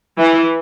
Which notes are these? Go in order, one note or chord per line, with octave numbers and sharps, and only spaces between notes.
E3